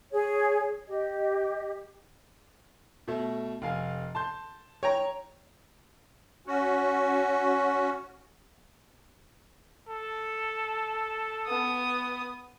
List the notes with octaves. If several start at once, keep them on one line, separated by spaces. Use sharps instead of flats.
G#4 C#5
G4 D#5
B2 A3
F1 F5 G#5
A5 C6 G6
C#5 G5 A#5
C#4 F#4
A4
B3 D#6